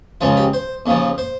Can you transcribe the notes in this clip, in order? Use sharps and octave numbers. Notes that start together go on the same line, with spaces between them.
C#2 C#3 F3 F4
G4
C5
D#2 C#3 F3
C5